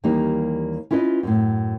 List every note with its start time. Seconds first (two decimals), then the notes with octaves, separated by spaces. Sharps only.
0.04 D#2 E3 G3 A#3 D#4
0.91 C#4 E4 F4 B4 D5 D#5
1.23 F#2 A2